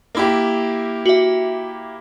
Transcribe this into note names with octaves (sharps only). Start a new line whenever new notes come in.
A#3 E4 G4
F#4 E5